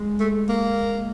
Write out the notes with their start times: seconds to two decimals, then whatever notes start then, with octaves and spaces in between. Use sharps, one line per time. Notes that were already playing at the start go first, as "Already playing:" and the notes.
Already playing: G#3
0.20 A3
0.49 A#3